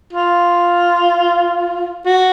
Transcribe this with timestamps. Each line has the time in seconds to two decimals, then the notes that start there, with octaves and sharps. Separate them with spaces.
0.13 F4
2.06 F#4